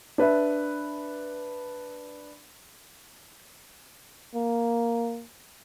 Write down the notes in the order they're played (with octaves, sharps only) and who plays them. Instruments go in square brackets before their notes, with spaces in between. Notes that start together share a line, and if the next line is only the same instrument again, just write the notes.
[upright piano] D4 B4 E5
[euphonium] A#3